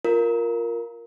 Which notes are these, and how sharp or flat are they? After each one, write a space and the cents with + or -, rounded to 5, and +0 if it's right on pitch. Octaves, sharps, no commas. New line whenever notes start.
F4 +0 A#4 +0